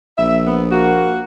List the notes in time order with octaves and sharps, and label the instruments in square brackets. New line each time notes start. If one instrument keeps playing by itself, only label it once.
[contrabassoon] A#1 [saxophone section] E5
[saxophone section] B3
A#3 F#4